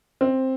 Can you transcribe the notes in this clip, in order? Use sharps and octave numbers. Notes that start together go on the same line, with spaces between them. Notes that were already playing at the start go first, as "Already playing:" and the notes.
C4